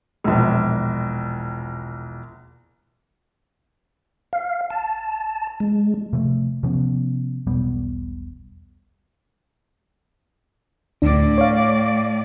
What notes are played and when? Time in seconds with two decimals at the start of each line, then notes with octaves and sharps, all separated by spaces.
0.24 E1 A#1
4.33 F5
4.70 A5
5.60 G#3
6.13 C3 F3 A3
6.63 C3 F3 B3 C#4
7.47 E1 B1 G3 B3
11.02 D2 A2 D4 D5
11.38 C#5 F5